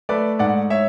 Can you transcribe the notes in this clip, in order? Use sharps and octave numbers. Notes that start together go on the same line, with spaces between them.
A3 B4 D5
G#2 D5 F#5
C#5 E5